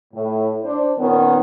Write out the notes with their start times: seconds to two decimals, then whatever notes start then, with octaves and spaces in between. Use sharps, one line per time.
0.13 A2
0.62 D4 C5
0.98 A#2 D#3 B3 C#4